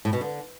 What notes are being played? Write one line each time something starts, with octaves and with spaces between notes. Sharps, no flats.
A2
B2
D3